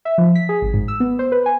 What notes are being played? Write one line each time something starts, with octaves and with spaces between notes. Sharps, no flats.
E5
F3
B6
G#4
G#1
G#2
E6
B3
C5
B4
G#5